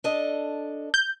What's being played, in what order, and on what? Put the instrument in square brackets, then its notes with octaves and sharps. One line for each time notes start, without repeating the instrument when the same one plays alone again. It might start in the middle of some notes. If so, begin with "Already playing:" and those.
[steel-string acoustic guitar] D4 A4 D#5
[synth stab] G6